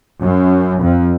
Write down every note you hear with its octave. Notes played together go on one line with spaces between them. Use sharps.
F#2
F2